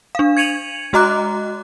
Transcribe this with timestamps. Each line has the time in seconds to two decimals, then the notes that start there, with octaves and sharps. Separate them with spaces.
0.15 D4 F5
0.37 G#6 C#7 D#7 F7 F#7
0.93 G#3 F#4 D#5 A#5 D6 F#6